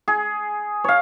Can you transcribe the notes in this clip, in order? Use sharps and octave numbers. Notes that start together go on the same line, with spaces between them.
G#4
C#5 F5